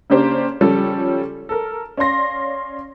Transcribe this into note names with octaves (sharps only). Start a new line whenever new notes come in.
C#3 A#3 C#4 D4 G4 C5
C#3 F3 G3 C#4 A4
A4 A#4
C#4 D5 F5 C6 A#6